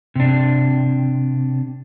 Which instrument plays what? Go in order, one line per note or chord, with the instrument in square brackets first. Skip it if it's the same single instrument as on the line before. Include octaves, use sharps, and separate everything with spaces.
[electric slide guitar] C3 D4